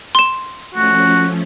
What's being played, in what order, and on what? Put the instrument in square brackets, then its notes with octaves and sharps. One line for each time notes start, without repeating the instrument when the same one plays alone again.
[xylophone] C6 E7
[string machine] F3 A3 C#4 [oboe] F#4